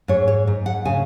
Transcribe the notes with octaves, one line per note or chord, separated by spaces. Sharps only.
G#2 C#5
C#5
G#2
F#5
C#3 G#5